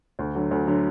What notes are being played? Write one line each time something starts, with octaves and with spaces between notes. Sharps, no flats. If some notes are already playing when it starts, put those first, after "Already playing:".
D2
D3 F#3
D2
D3 F#3